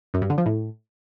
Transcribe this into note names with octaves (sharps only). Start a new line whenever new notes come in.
F#2
G2
D3
F3
A2